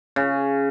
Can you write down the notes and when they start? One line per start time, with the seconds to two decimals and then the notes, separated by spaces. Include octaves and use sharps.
0.16 C#3